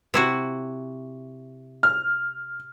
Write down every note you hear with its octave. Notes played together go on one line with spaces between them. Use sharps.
C3 E4 F#4
F6